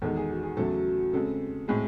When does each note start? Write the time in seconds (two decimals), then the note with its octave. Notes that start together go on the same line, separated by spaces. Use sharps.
0.02 E2 D#3 G#3 A4
0.16 G#4
0.29 F#4
0.43 G#4
0.57 E2 C#3 F#3 A3 A4
1.13 C#3 G#3 C4 A4
1.68 A2 G#3 C4 G#4